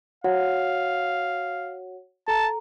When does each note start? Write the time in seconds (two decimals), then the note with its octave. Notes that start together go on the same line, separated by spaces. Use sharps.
0.24 F#4 C#5 F5 F#5
2.28 A4 A5 A#5